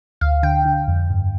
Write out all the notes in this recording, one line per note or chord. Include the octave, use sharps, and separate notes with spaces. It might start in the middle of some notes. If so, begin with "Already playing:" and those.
D2 F5
D3 G5
D3
F2
G2